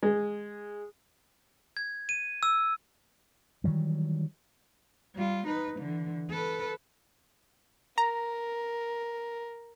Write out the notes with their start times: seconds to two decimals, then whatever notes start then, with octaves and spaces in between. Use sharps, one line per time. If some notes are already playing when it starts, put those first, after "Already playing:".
0.03 G#3
1.77 G#6
2.09 D#7
2.43 E6
3.64 D#3 E3 F#3 G3
5.15 G3 F4
5.46 D#4 B4
5.79 D3 E3
6.30 A4 B4
7.98 A#4 A#5